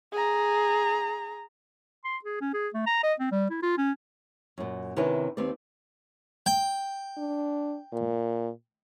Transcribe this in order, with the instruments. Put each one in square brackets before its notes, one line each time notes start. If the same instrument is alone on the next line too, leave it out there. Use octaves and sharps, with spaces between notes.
[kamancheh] G#4 A#5
[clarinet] C6
G#4
C#4
G#4
A3
A#5
D#5
C4
G3
E4
F4
C#4
[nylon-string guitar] F#2 A#2
C3 D#3 C#4 D4 E4 B4
D#2 C4 B4 D5
[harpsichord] G5
[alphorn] D4
A#2